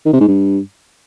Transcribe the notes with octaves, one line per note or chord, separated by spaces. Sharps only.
D#3
C3
G#2
G2